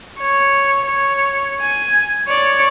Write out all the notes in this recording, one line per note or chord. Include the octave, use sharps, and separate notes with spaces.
C#5
C#5
G#5
C#5 D5